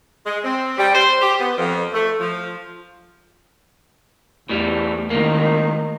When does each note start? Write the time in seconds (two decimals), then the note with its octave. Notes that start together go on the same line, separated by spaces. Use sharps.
0.25 G#3
0.44 C4
0.78 G3
0.94 C5
1.21 G4
1.40 B3
1.58 F2
1.94 A3
2.20 F3
4.49 E2 A2 G3
5.10 C#2 A2 D#3 A#3